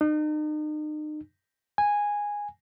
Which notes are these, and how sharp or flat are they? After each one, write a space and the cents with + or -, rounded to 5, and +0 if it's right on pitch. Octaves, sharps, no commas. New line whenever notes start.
D#4 -40
G#5 -10